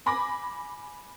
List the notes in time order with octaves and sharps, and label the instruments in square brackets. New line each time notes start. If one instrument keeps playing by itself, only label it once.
[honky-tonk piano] G#5 B5 D6 A#6